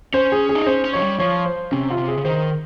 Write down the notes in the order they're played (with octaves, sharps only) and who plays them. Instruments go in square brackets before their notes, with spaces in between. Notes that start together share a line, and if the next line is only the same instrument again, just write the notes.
[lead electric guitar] C#4 [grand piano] C5
[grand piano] G#4
G#4
[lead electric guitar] D#4
[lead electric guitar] C#4 [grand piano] C5
[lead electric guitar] C#4
[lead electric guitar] F3 [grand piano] C#5
[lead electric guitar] G3
[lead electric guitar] F3 [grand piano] C#5
[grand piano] C5
[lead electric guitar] C3 [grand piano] C#4
[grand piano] F4
[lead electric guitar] C3
[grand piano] G#4
[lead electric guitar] C#3
[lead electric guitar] D#3 [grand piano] C5